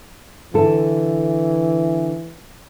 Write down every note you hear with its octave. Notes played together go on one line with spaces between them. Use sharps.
D3 E3 A4